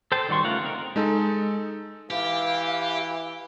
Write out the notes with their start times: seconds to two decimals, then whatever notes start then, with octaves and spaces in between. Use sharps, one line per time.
0.12 A4 C5 G5 A5
0.29 D#3 G3 F#4 C6 C#6
0.44 C#3 A3 F4 A#4 F#5
0.63 C4 D#4 A#4
0.96 G#3 D#4 A4
2.11 E3 G4 F5